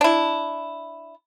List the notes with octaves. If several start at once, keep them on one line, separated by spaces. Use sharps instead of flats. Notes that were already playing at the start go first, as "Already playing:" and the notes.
D4 E4